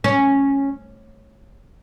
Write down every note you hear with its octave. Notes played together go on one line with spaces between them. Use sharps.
C#4